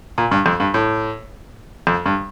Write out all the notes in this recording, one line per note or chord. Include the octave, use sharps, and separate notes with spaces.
A#2
G2
F2
G2
A2
F2
G2